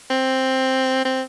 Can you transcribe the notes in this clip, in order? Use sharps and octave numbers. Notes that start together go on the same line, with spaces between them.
C4
C4